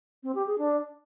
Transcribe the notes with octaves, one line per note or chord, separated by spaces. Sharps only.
C4
G4
G#4
D4